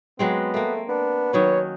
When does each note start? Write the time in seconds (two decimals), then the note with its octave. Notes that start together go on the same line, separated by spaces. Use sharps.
0.19 F#3 G#3 B3 C4
0.54 A3 A#3 C4
0.89 B3 D4
1.33 D#3 F#3 C#4 C#5